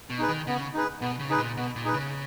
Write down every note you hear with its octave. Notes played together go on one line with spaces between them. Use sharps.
B2
D#4 G#4 B4
D#3
C#3 B3
D#4 G#4 B4
B2 B3
C#3
D#4 G#4 B4
A#2
B2 B3
A#2
D#4 G#4 B4
C#3